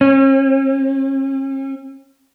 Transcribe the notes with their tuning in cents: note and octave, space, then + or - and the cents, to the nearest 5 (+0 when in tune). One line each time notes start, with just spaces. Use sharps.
C#4 -45